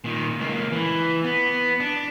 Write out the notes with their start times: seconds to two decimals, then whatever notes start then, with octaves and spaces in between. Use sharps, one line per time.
0.04 A#2 D#3
0.39 C#2 A#3
0.72 E3
1.24 B3
1.80 D4